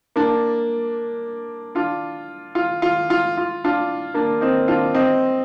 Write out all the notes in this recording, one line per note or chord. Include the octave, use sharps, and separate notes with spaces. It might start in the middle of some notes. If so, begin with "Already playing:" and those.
A#3 D4
D4 F4
F4
F4
F4
F4
D4 F4
A#3 D4
C4 D#4
D4 F4
C4 D#4